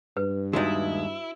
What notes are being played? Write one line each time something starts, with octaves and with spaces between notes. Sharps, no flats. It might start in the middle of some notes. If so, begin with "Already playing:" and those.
G2 B4
D#2 G#3 D#4 E4 F#4 D#5